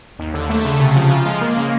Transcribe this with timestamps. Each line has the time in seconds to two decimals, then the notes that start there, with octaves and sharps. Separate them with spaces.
0.19 D#2
0.34 D3
0.50 A3
0.65 C#3
0.80 C3
0.96 F3
1.11 F4
1.26 G#3
1.41 A#3
1.57 C#3